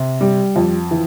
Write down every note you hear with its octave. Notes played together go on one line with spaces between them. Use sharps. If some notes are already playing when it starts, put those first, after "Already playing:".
Already playing: C3
G3
F2
E3